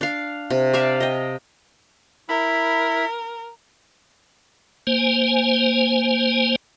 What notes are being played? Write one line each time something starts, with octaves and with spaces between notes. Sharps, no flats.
D4 F5
C3
D5 E5 F5 A5
D#5 G5
E4 A#4 B5
A#3 C5 G#5